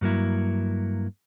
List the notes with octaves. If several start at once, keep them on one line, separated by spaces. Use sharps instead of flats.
G2 F#3 A#3 E4